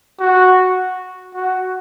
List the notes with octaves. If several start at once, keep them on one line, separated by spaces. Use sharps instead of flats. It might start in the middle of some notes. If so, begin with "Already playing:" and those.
F#4
F#4